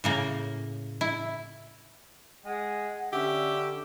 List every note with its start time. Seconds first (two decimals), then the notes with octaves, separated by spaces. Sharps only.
0.04 A2 C#3 A#3
1.01 E4
2.45 G#3 G#4 F#5
3.13 D3 C#4 G4 E5